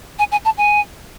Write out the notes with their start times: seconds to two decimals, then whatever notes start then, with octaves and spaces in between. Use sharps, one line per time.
0.19 G#5
0.32 G#5
0.45 A5
0.58 G#5